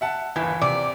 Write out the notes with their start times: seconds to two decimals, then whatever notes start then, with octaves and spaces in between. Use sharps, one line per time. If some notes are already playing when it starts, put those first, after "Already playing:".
0.01 E5 F#5 A5
0.36 G1 D#2 E3
0.62 C3 D5